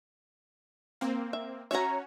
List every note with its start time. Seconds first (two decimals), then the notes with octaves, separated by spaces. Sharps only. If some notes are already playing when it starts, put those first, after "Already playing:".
1.01 A#3 C4
1.33 E5
1.71 C#4 F#4 C#5 E5 A#5